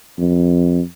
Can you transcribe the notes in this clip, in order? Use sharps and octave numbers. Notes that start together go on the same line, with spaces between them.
F2